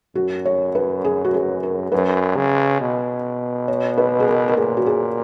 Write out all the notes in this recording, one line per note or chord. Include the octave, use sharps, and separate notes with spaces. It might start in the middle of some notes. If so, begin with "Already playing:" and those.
F#2 F#4
C#5
B4
G#4
F#4
G#4
A#4
F#2 B4
C#3
B2
C#5
B4
G#4
A#4
A#4
A#2 G#4
F#4
G#4